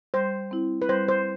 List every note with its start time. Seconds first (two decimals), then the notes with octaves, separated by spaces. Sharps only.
0.14 G3 C5
0.51 C4 E4
0.82 B4
0.89 G3 C5
1.08 C5